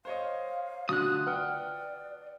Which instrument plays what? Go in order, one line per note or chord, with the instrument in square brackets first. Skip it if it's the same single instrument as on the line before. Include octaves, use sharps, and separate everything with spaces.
[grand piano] C5 C#5 D#5 [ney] F5
[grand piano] D3 A3 [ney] F4 [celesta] F#4 [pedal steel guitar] D#6 F#6
[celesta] B4 F6 [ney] D5 [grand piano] F#5 G5